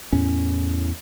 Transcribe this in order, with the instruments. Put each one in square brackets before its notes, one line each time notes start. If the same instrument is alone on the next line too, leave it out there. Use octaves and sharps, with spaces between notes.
[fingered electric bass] E2 A2 C#4